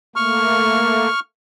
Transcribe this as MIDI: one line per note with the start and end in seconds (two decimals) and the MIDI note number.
0.16 1.09 57
0.16 1.09 58
0.16 1.20 85
0.16 1.20 89